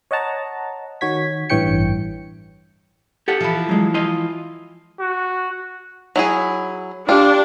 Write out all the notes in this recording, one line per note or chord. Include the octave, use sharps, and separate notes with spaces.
C#5 D#5 F#5 A5 A#5
D#3 F#4 C#5 G#6 B6
A1 G2 E3 C#5 G5 C#7
G4 A4 F#5
E3 F3
F#3 G#3
F4 D#5
F#4
F#3 E4 G#4
D4 F4 G4 D5 G5